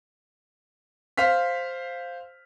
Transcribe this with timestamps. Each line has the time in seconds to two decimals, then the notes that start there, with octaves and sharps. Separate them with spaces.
1.18 C5 F5 F6 B6